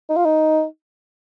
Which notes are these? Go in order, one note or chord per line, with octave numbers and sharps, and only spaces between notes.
D#4
F4
D#4